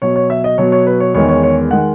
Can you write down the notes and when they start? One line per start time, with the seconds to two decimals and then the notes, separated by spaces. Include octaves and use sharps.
0.02 B2 F#3 C#5
0.16 C#5
0.30 E5
0.44 D#5
0.58 B2 F#3 C#5
0.72 C#5
0.87 B4
1.00 C#5
1.14 E2 D#3 G#3 C#5
1.29 C#5
1.43 C#5
1.71 D#3 G#3 F#5